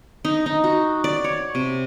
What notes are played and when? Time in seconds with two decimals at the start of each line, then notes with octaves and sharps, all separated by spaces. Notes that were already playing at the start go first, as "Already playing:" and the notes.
0.25 D#4
0.46 D#4
0.64 F#4
1.04 D5
1.24 C#5
1.55 C3